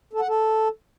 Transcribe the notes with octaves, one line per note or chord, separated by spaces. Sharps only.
A4
F#5
A4